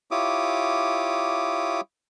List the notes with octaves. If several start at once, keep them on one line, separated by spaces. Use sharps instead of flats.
E4 F4 G4 C#5 D6 D#6